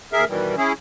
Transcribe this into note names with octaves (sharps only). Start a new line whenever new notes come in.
D#2 G#4 A#4 E5
B2 D#3 E3 G3
C#4 E4 G#4